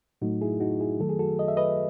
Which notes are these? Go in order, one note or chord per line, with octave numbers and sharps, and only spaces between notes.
A2 F#3 A3 D#4 F#4
E4 G#4
D#4 F#4
E4 G#4
D#3 F#3 A3 A4
G#4
F#4 A4
D#5
E5
B4 D#5